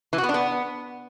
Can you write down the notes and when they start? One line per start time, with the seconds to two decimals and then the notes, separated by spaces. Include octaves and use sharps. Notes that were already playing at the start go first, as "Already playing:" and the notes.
0.13 E3
0.18 F#4
0.24 B3
0.29 D4
0.34 B3